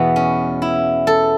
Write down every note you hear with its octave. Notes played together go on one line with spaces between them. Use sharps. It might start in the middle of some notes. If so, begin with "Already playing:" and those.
Already playing: E2 B2 B3
C#4
E4
A4